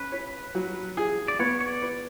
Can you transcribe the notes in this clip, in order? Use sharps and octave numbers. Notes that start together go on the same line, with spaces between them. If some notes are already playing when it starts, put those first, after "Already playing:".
Already playing: C#4 B4
C#5
F#3
G#4
D5
B3 C#5
C#5
D5
B4